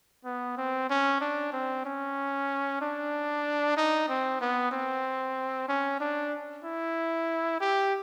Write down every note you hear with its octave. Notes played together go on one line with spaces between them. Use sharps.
B3
C4
C#4
D4
C4
C#4
D4
D#4
C4
B3
C4
C#4
D4
E4
G4